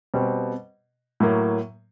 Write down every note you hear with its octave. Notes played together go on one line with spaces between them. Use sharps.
B2 G3 C4
A2 F#3 A#3